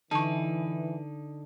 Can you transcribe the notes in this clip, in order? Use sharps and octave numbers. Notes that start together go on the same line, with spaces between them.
D3 E3 D#4 A5 C#6